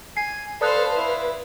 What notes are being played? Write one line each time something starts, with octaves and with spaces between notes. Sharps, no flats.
G#5 C7
A4 B4 C5 D5 F5 D#6 F#6
E4